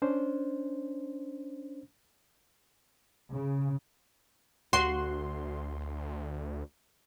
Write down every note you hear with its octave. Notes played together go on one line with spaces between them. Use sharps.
C#4 D4 C5
C#3
D2 F#4 C6